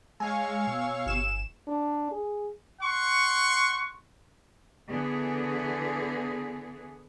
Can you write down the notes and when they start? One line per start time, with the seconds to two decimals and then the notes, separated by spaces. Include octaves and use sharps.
0.20 G#3 C#5 F5 G#5 C#6 E6
0.67 B2
1.06 G1 E7
1.68 D4
2.11 G#4
2.81 F#5 C6 C#6
4.89 D3 E3 B3 G#4